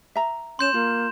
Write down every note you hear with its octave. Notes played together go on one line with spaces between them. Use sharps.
E5 A#5
C#4 C6 G6 E7
A#3 F4